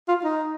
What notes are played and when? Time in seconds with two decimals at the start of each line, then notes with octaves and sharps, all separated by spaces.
0.08 F4
0.24 D#4